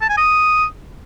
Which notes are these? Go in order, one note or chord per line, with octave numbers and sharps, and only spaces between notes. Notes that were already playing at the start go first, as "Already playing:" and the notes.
A5
G#5
D#6